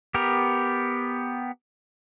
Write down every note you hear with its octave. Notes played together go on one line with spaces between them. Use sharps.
B3 G4 A#4